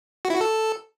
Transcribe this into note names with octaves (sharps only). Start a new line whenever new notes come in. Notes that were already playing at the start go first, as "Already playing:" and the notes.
F#4
E4
F#4
A4